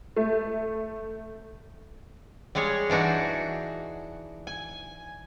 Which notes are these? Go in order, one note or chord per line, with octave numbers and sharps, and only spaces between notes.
A3
G3 G#3 G#4 C#5
E3 D4 D#4 F#4
G#5